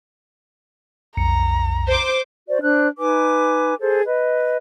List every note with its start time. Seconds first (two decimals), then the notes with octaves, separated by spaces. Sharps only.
1.17 B1 F2 A#5 C#7
1.88 C5 D6
2.48 F#4 C5 D5
2.62 D4 C5 F#6
2.98 D#4 B4 G#5 D6
3.80 G#4 A4 C5
4.05 B4 D#5